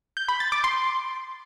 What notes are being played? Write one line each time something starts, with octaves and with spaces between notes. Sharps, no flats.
G6
B5
A6
D6
C6